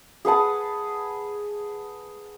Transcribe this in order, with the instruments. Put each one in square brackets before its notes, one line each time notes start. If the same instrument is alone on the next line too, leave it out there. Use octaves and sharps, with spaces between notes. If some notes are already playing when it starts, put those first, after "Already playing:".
[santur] G#4 B4 F#5 A5